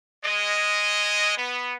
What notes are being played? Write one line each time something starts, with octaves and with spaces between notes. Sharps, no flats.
G#3 D#5
B3